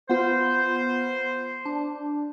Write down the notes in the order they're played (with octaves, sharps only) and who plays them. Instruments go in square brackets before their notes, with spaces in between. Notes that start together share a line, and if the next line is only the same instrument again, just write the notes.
[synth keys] B3 F4 [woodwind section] C5
[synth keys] D4